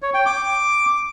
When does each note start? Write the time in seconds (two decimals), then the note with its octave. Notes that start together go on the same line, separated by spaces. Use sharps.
0.02 C#5
0.14 G5
0.26 D6